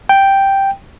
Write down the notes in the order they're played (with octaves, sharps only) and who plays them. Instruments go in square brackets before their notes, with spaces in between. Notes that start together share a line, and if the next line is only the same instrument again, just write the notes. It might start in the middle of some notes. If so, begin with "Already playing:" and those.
[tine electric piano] G5